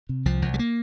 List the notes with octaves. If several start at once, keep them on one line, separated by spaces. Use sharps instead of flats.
C3
C2 F3
C2
G3
A#3